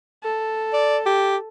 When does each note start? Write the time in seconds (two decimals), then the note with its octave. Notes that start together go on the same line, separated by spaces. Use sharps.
0.23 A4
0.73 D5
1.06 G4